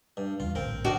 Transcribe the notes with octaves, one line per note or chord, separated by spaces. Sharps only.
G2
E2 G2 C#3 F4
A#1 A2 D3 C4 A#4
D4 D#4 F#4 A#4